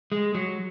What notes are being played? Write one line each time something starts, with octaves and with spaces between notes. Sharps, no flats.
G#3
F#3